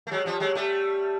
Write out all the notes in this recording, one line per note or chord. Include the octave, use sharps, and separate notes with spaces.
A3
F#3 G#3
F3 G3
F#3 G#3
G3 A3